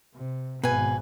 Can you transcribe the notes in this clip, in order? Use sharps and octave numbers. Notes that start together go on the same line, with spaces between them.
C3
G#1 B2 B4 G#5